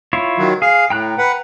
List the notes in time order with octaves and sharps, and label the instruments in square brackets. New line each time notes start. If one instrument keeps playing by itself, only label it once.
[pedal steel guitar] E4 F4 C#5
[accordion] D#3 F#3
[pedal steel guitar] G#4 [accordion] F5
[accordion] A2 [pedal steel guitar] G5 A#5 F#6
[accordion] B4 F#5